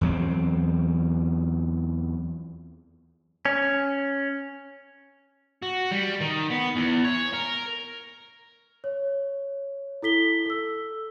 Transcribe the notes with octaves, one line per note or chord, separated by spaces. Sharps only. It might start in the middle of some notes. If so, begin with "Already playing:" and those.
E2 F#3 C4
C#4
F#4
G3
D#3
B3
E2
C#5
A#4
C#5
E4 A4 B6 G7
A4 E6